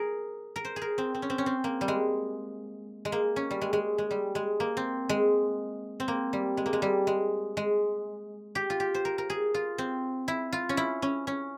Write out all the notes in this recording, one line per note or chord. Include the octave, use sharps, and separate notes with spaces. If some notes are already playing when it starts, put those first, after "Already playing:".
Already playing: G#4 A#4
A#4
C5
G#4
A#4
C4
C4
C#4
C4
C#4
C4
A#3
G3
G#3
G#3
A#3
C#4
G3
G#3
G#3
G#3
G3
G#3
A#3
C4
G#3
C4
A#3
G3
G#3
A#3
G#3
G3
G#3
G#3
G4
F4
G4
C5
A#4
A#4
G#4
F4
C4
E4
F4
C#4
E4
C#4
C#4